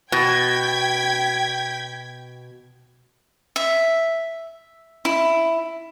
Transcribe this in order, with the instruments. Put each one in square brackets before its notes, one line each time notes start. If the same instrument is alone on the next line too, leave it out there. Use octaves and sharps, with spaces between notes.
[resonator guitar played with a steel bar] B2 [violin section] G5 G#6 B6
[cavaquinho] E5
E4